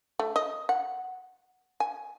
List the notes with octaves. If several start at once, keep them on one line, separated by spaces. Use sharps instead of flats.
A3
D#5
F#5
G#5